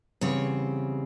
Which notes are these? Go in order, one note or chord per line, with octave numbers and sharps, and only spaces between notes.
E2 C#3 G3 C4 C#5